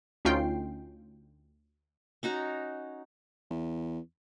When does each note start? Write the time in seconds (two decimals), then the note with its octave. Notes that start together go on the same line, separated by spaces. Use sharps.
0.25 D2 C#4 D#4 F4 G5 C7
2.23 C#4 D#4 F#4 A#5
3.51 E2